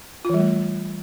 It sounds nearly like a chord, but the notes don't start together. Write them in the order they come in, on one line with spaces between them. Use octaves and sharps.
F4 E3 G3 A3